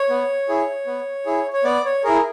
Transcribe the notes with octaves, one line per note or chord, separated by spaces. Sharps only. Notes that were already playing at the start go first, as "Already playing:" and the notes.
Already playing: C#5
B3
E4 G#4
B3
E4 G#4
C#5
B3 D5
C#5
E4 G#4 A#4